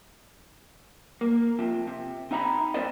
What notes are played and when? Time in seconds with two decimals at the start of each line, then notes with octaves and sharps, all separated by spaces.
1.21 A#3
1.59 C3 F3
1.87 C3
2.31 C4 D#4 E5 A#5 B5
2.74 C4 E4 A#4 C5 D5 D#5